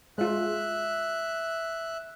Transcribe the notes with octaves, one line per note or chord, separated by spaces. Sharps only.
G#3 F4 E5 F#6